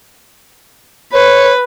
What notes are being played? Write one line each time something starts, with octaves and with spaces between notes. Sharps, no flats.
B4 C#5